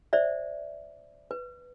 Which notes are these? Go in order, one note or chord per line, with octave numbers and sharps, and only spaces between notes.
C5 D5 E5
B4